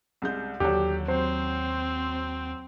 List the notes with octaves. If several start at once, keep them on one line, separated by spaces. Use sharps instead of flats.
C2 G#3 G6
D#2 D3 F#3 G4
F#3 C4 C5